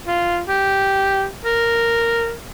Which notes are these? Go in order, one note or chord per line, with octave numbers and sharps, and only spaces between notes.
F4
G4
A#4